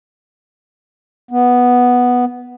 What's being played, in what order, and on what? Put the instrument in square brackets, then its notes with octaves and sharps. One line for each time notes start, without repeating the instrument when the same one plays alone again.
[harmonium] B3